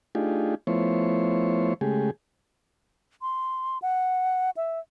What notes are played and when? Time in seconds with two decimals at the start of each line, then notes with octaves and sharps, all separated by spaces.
0.15 A3 D4 D#4 F4 G4 G#4
0.67 F3 A3 B3 E4 C5 C#5
1.81 C#3 G#3 A3 G4 G#4
3.22 C6
3.82 F#5
4.57 E5